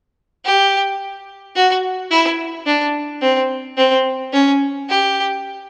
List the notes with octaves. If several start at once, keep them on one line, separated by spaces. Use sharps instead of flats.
G4
F#4
E4
D4
C4
C4
C#4
G4